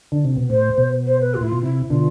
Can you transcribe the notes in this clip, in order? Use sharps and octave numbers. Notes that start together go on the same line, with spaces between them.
D3
C3
B2
A2 C5
B2
C5
B4
F4
A2 E4
B2 F4
C3 E4
B2 D3 F4